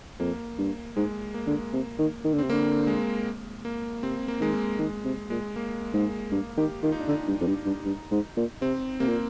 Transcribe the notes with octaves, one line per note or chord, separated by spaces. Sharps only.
F2 A#3
G2
G#2 G#3
A#3
D3
C3
D#3
D#3
D3
C3 C4
D3 A#3
G#3
A#3
C3 C4
A#3
D#3 G#3
A#3
D#3 G#3
C3
A#2 G#3
A#3
G#2 G#3
G2 A#3
D#3 G4
D#3 F4
D#4
D4
D3 D#4
G2
F2
G2
G2
G2
G#2
A#2
C3 C4
C3 A#3
A#2